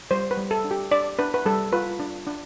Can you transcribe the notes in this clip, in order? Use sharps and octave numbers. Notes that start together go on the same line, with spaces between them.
G3 C5
B4
G3
A4
D4
G4
D4 D5
D4 B4
B4
G3 A4
F4 B4
D4
D4